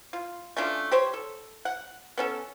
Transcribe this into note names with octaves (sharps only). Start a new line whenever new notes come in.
F4
A3 C#4 D4 F4
G4 C5 C#5
A4
F#5
B3 C#4 A4